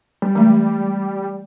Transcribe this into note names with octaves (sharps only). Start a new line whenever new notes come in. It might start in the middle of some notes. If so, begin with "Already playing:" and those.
G3
E3 G#3 A3